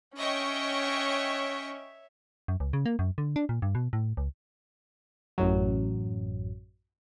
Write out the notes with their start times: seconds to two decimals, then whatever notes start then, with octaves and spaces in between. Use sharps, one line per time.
0.17 C#4 C#5 D#5 E5 G5 C#6
2.48 F#2
2.60 C#2
2.73 C#3
2.86 A#3
2.99 F#2
3.18 D3
3.36 D4
3.49 A#2
3.62 G2
3.75 B2
3.93 A2
4.17 C#2
5.38 A1 F#2 F#3